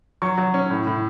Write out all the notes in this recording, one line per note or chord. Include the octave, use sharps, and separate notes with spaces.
F#3 C#6
F#3
C#4
A2
A2